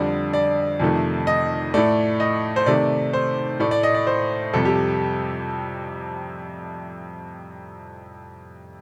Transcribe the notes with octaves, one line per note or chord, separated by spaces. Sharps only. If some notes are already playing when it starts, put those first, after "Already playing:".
Already playing: F2 D3 G3 D5
D5
F2 C3 D#3 A3
D#5
A2 A3 D5
D#5
C5
C3 D#3 A3 D5
C5
A2 A3 D5
D5
D#5
D5
C5
F2 C3 G3 A4
G4